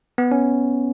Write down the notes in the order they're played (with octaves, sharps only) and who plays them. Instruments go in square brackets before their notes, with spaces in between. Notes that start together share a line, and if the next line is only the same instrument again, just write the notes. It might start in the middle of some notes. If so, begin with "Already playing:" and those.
[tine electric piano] B3
C#4